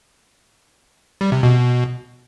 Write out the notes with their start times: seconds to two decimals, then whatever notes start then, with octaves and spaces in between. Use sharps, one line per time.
1.21 G3
1.32 C3
1.43 B2